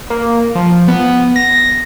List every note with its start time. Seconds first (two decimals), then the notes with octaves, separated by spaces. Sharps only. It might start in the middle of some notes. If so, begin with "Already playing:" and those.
0.10 A#3
0.55 F3
0.88 B3
1.36 A#6